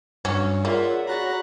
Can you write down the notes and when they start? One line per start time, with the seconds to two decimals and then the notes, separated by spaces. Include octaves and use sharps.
0.25 G2 F#3 C#4
0.65 A#3 F4 G#4 C#5 D5 E5 F#5
1.07 F#4 A#5 B5 F#6 A6